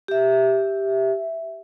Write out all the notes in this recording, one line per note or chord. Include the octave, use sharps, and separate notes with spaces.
G4 E5